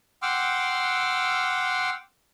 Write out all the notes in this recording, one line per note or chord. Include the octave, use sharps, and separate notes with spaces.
F#5 G5 C6 D6 E6 F6